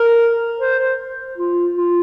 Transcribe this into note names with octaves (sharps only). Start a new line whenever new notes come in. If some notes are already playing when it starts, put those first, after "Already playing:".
Already playing: A#4
C5
C5
F4
F4